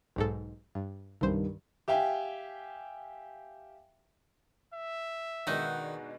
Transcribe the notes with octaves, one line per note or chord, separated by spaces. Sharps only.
B1 G#2 A4
G2
C2 G2 D#3 C5
G4 E5 F5 G5 G#5
E5
B2 D#3 G#3 D4 D#4 F#5